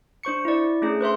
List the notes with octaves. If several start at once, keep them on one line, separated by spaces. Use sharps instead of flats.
D4 C5 C#6 C#7
E4 D5
A3 C#4 D4 G#4
B4 C5 E5 C6